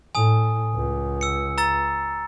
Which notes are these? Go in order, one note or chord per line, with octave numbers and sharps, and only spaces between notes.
A2 G#5 D#6
C#2
E6 C#7
A#5 E6 A6